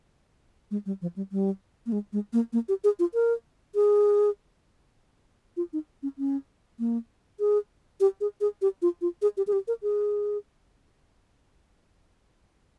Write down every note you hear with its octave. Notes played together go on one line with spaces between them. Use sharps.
G#3
G3
F3
G3
G3
A#3
G#3
G#3
A#3
A#3
G4
G#4
F4
A#4
G#4
F4
D#4
C#4
C#4
A#3
G#4
G4
G#4
G#4
G4
F4
F4
G#4
G4
G#4
G4
A#4
G#4